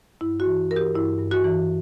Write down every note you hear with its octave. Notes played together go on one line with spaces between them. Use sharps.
G2 E4
F#4
E3
E3 A#4
G4
G2 E4
G2
F#4
E3